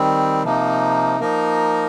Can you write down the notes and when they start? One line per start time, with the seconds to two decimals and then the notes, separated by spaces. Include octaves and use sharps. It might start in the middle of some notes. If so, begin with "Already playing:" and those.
Already playing: D#3 G3 C4
0.44 C3 F3 A#3 D#4
1.20 F3 A#3 D#4 A#4